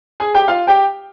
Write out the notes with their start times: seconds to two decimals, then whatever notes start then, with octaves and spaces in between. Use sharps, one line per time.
0.20 G#4 G#5
0.34 G4 G5
0.48 F4 F5
0.67 G4 G5